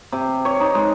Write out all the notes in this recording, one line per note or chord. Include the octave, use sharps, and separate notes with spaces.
C3
C#5
D#4
G#3